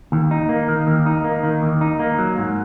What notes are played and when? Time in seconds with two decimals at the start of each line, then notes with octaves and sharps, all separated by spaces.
0.12 D#2
0.31 D#4
0.49 A#3
0.68 D#3
0.87 D#2
1.06 D#4
1.24 A#3
1.43 D#3
1.62 D#2
1.81 D#4
1.99 A#3
2.19 F#3
2.37 G#2